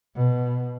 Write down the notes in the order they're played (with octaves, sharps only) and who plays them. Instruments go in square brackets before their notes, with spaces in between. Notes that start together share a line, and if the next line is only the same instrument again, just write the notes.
[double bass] B2